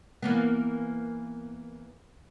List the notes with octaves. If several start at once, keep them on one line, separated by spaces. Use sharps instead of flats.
E3 A#3 B3